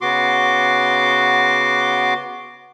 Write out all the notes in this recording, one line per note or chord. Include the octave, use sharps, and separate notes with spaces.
C#3 B3 F#4 C6 D6